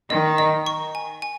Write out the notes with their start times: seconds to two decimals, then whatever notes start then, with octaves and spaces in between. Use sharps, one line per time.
0.10 D#3 D#5
0.38 D#5
0.66 C#6
0.95 G#5
1.22 G#5